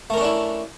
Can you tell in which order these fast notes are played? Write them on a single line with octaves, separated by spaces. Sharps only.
A3 A#4 C#4 D4 E4